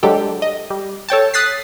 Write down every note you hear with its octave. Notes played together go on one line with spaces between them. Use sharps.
F#3 G#3 D4 G4 A4
D#5
G3
A4 C#5 G5 A5
D#6 F#6 A6 B6 C7